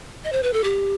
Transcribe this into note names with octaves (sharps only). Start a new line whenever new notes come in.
D#5
C5
B4
A4
G4